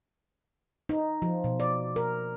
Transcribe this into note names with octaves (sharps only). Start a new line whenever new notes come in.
D#4
F3
B2
D5
A#4